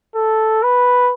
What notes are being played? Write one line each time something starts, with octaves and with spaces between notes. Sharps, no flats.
A4
B4